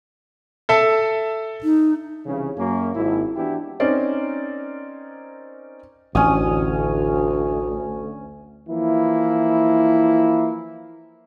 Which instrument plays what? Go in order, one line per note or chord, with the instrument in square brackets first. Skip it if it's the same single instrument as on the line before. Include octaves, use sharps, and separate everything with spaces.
[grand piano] A4 E5 A5
[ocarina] D#4
[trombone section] C2 C#3 E3
F#2 A#3 C#4
G#1 E4
E3 B3 D4 E4 F#4 G4
[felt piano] C4 C#4 D#4 A#4 C5 D5
[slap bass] A1 [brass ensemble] D2 [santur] C#4 D#6
[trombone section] E3 F3 A#3 E4